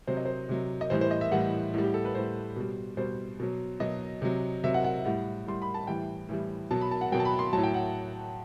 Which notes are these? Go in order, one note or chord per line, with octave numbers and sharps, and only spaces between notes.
C3 F#3 C5
D#5
C5
C3 F#3
D#5
A2 E3 G3 C5
C5
D#5
E5
A2 E3 G3 F#5
A2 G3
G4
A4
B4
A2 G3 C5
B2 G3
B2 G3 C5
B2 F#3
B2 F#3 D#5
C3 F#3
C3 F#3 E5
F#5
F#5
E5
A2 G3 F#5
A2 G3 C6
B5
A5
A2 E3 G3 G5
A2 E3 G3
B2 F#3 A5
B5
A5
F#5
B2 F#3 G5
A5
B5
C6
A2 F#3 A5
G5
F#5